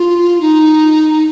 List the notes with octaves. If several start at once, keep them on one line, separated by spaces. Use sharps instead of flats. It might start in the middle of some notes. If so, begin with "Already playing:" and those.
Already playing: F4
D#4